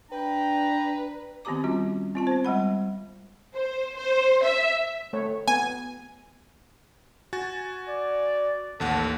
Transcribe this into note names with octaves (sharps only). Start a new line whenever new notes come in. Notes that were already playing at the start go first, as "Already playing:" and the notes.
D4 B4 G5 A#5
D#3 B3 C4 G4 A#5 D6
G3 C#4 F4 F#4
C4 F4 A5
B3 C5
G3 G#3 F#5 B5
C5
C5
E5
A3 C#5
B3 G#5
F#4 G#5 A6
D5
A1 D#2 A4 F#5